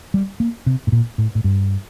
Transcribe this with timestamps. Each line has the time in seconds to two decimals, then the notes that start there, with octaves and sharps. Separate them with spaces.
0.14 G3
0.40 A#3
0.66 C3
0.87 A2
0.92 A#2
1.18 A2
1.35 A2
1.44 G2